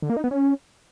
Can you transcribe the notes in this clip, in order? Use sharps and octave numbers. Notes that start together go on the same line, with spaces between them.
D3
A#3
D#4
B3
C#4